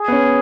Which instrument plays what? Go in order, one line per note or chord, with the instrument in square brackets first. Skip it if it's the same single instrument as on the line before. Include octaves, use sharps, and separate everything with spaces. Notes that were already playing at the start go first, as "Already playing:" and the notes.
Already playing: [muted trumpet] G#4
[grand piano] B3
C#4